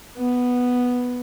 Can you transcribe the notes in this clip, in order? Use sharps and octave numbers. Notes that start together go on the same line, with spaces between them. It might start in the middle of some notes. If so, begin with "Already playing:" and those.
B3